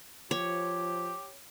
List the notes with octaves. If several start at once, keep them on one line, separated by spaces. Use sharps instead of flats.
F3 G4 C#5